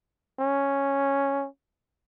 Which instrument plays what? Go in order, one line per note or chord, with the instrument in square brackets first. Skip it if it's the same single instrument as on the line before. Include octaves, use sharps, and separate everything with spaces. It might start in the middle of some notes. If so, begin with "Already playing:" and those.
[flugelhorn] C#4